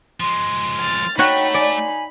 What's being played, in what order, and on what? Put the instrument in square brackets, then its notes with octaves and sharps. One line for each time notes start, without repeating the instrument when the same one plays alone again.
[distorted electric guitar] F3 G#3 [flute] C6
[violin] F6 A6
[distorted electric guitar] A3 [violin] D#4 B5 [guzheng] F#4 C#5 F#5 [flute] G5
[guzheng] D5 [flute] G#5